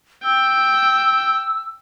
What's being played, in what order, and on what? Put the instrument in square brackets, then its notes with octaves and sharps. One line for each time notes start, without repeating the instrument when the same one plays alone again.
[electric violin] G5 [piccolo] E6